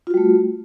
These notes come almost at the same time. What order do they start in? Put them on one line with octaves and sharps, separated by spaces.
F4 F#4 G3 A3